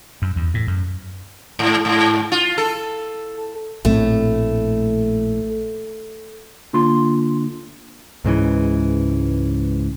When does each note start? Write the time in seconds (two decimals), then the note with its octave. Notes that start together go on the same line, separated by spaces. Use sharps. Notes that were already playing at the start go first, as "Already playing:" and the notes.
0.22 F#2
0.36 E2
0.54 A2
0.67 F#2
1.59 G#2
1.85 G#2
2.32 F4
2.58 A4
3.85 A#1 A2 A3 C4
6.73 D3 A#3 F4 C6
8.25 C#2 G#2 C#3 E3